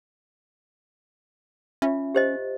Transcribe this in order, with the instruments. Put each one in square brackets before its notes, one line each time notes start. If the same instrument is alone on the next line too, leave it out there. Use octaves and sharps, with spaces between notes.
[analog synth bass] C#4 [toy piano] F4 E5
[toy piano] G4 C5 D#5